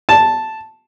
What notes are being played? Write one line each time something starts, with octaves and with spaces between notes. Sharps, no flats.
A5